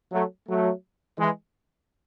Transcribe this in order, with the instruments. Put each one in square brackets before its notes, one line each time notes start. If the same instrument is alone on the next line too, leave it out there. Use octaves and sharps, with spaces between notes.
[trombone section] F#3 A3
F#3 A3
E3 G#3